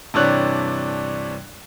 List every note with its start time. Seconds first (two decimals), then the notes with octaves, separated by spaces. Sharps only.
0.14 G2 C3 E3 D4 C#5 F#6